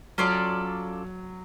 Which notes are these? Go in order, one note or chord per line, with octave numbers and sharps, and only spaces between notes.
F#3 C#4 F4 A4 D5